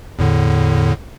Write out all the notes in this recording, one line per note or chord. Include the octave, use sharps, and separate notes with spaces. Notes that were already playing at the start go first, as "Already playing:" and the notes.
E2 A2 D3